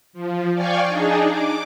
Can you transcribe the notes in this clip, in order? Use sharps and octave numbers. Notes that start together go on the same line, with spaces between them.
F3
D5 F5 G5 G#5 C#6
D4 D#4 G#4
D6